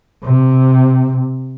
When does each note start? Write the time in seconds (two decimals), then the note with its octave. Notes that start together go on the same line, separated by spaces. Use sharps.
0.24 C3